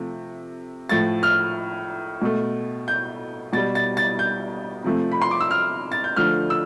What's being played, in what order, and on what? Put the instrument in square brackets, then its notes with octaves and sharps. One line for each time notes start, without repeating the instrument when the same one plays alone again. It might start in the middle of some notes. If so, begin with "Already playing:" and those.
Already playing: [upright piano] C3 F3 A3
A2 F3 A3 A6
F6
B2 A3
G6
B2 G3 A6
A6
A6
G6
C3 F3 A3
B5
C6
D6
E6
F6
A6
G6
D3 F3 A3 F6
E6